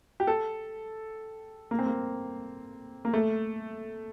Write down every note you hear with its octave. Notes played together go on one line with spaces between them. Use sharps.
G4
A4
A#3
C4
A#3
A#3
A3